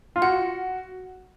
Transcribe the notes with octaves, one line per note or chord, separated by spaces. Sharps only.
F4
F#4 F#5